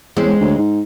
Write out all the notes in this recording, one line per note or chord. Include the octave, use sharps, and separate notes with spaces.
E2 G#3 C4 C#4
D2
G#2